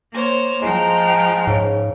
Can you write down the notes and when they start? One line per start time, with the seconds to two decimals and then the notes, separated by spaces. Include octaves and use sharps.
0.13 A#3 C5 C#5
0.62 F3 G#3 G5 A#5
1.47 G#2 C#3